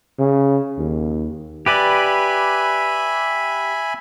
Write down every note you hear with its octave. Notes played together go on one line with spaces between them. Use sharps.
C#3
D#2
G4 B4 D5 E5 G#5 B5